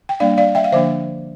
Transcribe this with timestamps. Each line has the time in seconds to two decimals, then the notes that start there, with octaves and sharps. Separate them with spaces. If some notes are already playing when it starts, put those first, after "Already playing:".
0.09 G5
0.20 G3 A#3 D4 D5 F5
0.38 D5 F5
0.55 E5 G5
0.64 F5
0.72 D3 F3 A#3 D4 C5 E5